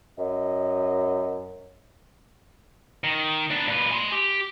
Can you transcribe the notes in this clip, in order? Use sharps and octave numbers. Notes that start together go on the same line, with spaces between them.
F#2 D#5
D#3
B3 D4
A#2 B4
G#5 C6
G4